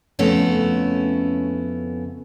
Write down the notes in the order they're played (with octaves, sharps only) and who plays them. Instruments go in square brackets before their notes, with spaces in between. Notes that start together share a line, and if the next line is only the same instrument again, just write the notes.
[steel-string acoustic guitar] F2 C#3 A3 B3 C#4 E4